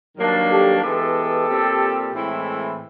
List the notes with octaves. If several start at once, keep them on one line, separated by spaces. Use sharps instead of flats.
G2 D#3 F#3 A#3 D4
G4 A4
E3 G#3 B3 G4 A4
A#2 G3 C4
A2 E3 G#3 C4 E4